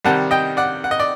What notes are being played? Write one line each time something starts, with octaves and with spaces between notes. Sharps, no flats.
C3 D#3 G3 F#5 A5
D#5 G5
D5 F#5
F#5
D#5
D5